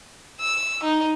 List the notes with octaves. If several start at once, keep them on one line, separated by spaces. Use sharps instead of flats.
E6
D#4